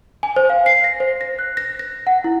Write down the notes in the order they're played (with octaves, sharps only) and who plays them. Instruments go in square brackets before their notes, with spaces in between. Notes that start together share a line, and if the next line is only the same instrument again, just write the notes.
[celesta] G#5
C5
F5
C7
A#6
C5
A#6
F#6
A#6
A#6
F#5
E4